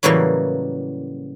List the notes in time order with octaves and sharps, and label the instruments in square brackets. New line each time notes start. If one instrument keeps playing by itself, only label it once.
[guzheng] A2 C#3 E3 F#3 G3 A#3